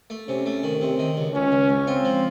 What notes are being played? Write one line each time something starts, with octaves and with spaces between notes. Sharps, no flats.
A3
C3 C#4
A3
D#3
C3 C4
D#3
C#2
C#2 C#4
C#2
C#2
C4 F4
F3